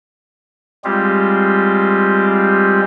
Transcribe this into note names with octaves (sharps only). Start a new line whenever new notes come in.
G3 G#3 C4 F4 G4